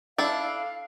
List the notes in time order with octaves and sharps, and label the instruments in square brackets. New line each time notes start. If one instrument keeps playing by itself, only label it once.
[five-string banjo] D4 E4 A4 [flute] F5